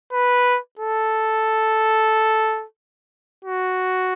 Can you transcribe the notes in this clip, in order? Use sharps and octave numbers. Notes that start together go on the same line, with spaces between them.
B4
A4
F#4